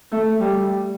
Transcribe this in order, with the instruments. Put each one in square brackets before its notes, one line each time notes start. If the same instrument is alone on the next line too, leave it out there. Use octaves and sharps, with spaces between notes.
[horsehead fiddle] A3
G3